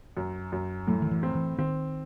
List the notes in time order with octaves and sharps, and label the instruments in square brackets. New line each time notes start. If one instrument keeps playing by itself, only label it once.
[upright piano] F#2
F#2
[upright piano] A2 [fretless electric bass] F#3
[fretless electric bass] D#3
E3
[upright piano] C4
[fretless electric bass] E3
[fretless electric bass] D#3 [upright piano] C4